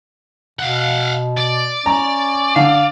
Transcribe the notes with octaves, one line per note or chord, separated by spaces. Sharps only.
B2 F5 F#5
D5
C#4 A#5
D3 F5